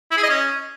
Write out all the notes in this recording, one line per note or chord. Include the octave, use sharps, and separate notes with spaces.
E4
G#4
D#5
C#4